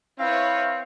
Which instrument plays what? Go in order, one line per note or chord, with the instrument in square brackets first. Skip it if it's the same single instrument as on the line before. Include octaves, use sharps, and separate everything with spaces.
[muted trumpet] C4 [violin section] E4 B4 C#5 [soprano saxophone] F5